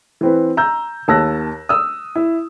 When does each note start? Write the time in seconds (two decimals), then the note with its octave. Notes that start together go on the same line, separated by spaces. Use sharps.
0.21 E3 C4 B4
0.57 A#5 E6 G6
1.08 D#2 A5 E6 F#6 A#6
1.69 D#6 E6
2.16 E4